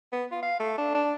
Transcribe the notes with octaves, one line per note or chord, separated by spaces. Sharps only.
B3
F4
F5
A3
D4
D4